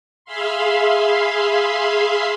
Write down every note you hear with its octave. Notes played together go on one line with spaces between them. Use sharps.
G#4 E5 F5 B5 C6